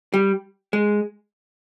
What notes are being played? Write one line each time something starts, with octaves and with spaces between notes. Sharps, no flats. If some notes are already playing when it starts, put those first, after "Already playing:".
G3
G#3